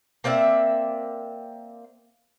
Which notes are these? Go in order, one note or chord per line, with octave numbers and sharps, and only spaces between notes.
A#3 C4 D5 E5